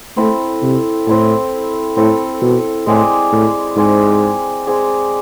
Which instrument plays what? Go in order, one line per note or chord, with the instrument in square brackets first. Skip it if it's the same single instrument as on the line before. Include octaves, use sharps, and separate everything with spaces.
[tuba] A3 [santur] C4 E4 A4
[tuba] C3
[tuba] A2 [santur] C4 E4 A4
[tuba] A2 [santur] C4 E4 A4
[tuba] B2
[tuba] A2 [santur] G#3 C4 G#4 D5
[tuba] A2
[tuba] G#2 [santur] G#3 C4 G#4 D5
[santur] G#3 C4 G#4 D5